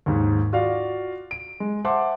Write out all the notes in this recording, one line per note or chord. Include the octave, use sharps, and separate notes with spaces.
D#2 G#2
F4 F#4 D5 F5 F#5
D7
G#3
C5 E5 F#5 A5 C6 D6